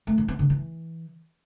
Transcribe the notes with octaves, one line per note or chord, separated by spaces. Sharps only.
A3
E3
B3
D3
E3